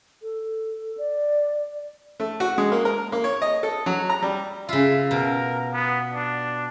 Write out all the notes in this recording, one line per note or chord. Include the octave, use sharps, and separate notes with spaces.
A4
D5
A3
F#4
G#3
A#3
A#4
A#3
C#5
D#5
A4
F#3
A#5
G3
C#3 F4 E5
B2 A#4
B3
D4